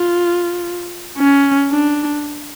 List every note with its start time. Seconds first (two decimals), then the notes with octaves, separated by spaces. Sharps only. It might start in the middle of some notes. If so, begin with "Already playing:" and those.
Already playing: F4
1.19 C#4
1.71 D4